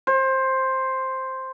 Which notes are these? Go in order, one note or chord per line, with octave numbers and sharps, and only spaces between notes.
C5